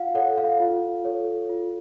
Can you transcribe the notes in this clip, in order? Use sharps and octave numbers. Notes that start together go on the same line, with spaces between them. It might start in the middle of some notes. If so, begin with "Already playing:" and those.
Already playing: F4 F5 F#5
A4 C#5 F#5
F5
F4
A4 C#5
F4